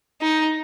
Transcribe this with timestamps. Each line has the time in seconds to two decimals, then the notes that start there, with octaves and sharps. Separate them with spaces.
0.22 D#4